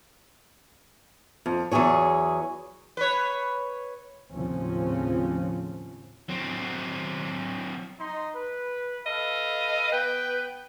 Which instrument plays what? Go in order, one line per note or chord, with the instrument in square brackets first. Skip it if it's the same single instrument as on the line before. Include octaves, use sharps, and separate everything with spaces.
[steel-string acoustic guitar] F2
E2 B2 F#3 G#4 C#5
[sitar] B4 C#5
[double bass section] D#2 A2 C#3 F3 C4 C#4
[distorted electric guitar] F#3 C4
[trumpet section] D#4 C6
B4
[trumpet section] A4 B4 F5 [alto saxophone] D#5
[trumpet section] B3 G5 [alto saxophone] B4